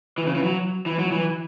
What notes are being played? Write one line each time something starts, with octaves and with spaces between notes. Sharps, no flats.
E3
C#3
E3
F#3
E3
F#3
E3